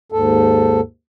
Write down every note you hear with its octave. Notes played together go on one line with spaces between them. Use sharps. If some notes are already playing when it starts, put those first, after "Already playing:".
D#2 G#2 A4